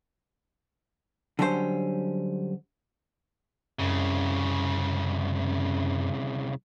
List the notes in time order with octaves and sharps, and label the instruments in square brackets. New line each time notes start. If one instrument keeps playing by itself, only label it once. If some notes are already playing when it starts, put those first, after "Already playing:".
[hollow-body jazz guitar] D3 F#3 G3 C#4 F4 C5
[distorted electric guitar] C2 C#3 [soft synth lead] F#2